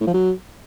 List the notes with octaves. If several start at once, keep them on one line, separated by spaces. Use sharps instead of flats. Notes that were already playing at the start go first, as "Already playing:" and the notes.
A2
F3
F#3